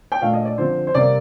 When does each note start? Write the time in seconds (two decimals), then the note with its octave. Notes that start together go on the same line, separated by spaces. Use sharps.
0.12 G5
0.22 A#2 A3 D4 F5
0.33 D#5
0.45 D5
0.58 D3 F3 C4 C5
0.87 C5
0.94 C3 G3 A#3 D5